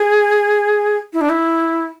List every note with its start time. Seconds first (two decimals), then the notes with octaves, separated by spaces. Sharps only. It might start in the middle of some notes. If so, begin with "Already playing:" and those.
Already playing: G#4
1.13 E4
1.21 D4
1.29 E4